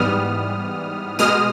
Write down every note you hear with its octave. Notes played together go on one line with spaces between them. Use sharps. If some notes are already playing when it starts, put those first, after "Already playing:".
Already playing: G#2 E3 G3 B3 D#6 F6
B2 G#3 D#6 F6